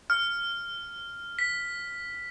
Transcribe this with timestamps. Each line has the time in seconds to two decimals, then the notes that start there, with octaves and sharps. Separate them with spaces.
0.10 F6
1.39 B6